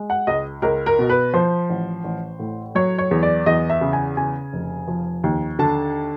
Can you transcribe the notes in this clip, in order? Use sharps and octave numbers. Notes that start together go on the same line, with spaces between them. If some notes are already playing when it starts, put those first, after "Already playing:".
Already playing: G#3
F#5
C#2 D#5
C#2 A#4
A#4
B2
B4
F3 C5
A1
A1
A2
F#3 C#5
C#5
E2
D5
E2 D#5
E5
C#3
G#5
C#3 G#5
F1
F3
D#2
D3 A5